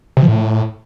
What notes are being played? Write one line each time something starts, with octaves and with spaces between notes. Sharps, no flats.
C3
F3
A2